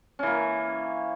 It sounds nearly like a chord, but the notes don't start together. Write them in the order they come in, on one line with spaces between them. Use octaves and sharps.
C#4 E3 A#3